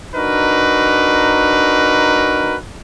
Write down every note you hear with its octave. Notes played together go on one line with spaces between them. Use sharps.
D4 D#4 F#4 A#4 B4